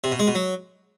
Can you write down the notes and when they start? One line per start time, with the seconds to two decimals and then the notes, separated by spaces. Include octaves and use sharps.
0.04 C3
0.12 B2
0.19 G#3
0.27 B2
0.35 F#3